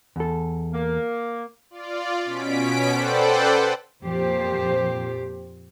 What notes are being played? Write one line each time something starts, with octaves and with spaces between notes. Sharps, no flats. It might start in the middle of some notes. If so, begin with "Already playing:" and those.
E2 A4
A#3
F4 D5
B2 C#4 B6 D7
A4 B4 C5 D5 F#5 G5
F2 A#2 F3 G4 C5